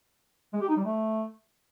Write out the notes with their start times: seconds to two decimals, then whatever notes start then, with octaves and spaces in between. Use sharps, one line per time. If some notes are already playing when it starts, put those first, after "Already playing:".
0.53 G#3
0.61 G4
0.69 D#4
0.77 G3
0.84 A3